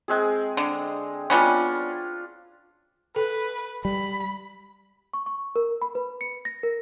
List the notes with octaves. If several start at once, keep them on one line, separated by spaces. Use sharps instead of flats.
G#3 C4 G#4
D3
G3 B3 C#4 D4 F4
A4 B4
G3 B5
C#6
C#6
A#4
B5
B4
C#7
A#6
A#4